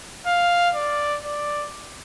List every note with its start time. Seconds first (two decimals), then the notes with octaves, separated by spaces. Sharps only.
0.27 F5
0.75 D5
1.24 D5